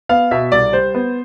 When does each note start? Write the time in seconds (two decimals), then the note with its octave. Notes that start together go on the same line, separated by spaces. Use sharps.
0.09 B3 F5
0.31 B2 E5
0.52 C2 D5
0.73 G3 C5
0.95 B3